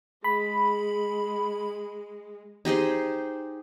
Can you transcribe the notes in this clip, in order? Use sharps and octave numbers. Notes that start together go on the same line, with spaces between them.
G#3 G#4 B5
D#4 G4 G#4 C5